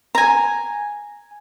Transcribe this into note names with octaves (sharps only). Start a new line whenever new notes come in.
G#5 A#5